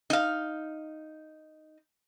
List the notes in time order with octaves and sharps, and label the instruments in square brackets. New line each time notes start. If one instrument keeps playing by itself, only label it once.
[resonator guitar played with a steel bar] D#4 F5